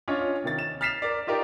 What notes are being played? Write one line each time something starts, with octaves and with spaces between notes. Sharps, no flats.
C#4 D4 F4 C#5 D#5
C3 D#3 A6
E7
F6 A6 B6 C7 E7 F7
A#4 D5
D#4 F4 G4 A#4 D5